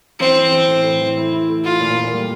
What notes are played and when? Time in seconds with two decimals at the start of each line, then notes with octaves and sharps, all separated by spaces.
0.19 E3 C4
0.36 E3
0.52 E3
0.69 A2
0.84 A2
1.01 E3
1.17 E4
1.32 E4
1.49 A3
1.65 A3 F4
1.81 A#2
1.98 A#2
2.13 G3